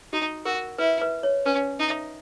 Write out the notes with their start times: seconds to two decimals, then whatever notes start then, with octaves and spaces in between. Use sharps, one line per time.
0.13 D#4 F#4
0.45 F#4 A#4
0.78 E4 B4
1.01 B4
1.23 C#5
1.46 C#4 B4
1.79 D#4
1.90 E5